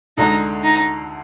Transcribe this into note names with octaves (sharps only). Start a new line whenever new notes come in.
D2 D3 G#3 D#4
D#4